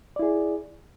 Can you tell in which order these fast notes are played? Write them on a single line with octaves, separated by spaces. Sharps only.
D5 E4 G#4